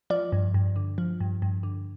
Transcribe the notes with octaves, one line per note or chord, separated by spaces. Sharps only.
F3 D5
G2
G2
D3
F3
G2
G2
D3